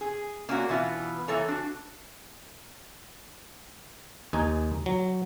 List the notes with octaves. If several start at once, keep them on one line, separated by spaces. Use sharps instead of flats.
G#4
A#3 C#4 D4 E4 F#4
B2 E3 B3 F4
E3 A#3 A4 C#5 A#5
D4 F#4
D#2 D#4 G#5
F#3